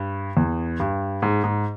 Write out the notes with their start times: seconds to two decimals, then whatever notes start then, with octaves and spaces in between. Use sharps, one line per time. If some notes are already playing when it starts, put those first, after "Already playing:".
Already playing: G2
0.37 E2
0.80 G2
1.22 G#2
1.44 G#2